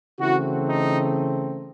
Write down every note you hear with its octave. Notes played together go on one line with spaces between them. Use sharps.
C#3 E3 A3 C4 E4 F#4
D#4